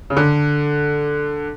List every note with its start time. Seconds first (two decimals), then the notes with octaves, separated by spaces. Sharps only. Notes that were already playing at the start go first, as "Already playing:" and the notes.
0.10 C#3
0.17 D3